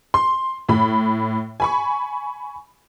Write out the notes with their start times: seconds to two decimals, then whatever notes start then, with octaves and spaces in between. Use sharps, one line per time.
0.14 C6
0.69 A2 B5
1.60 G#5 B5 C#6